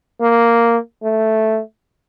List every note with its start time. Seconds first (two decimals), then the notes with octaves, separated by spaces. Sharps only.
0.21 A#3
1.03 A3